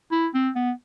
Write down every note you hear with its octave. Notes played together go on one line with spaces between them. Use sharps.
E4
C4
B3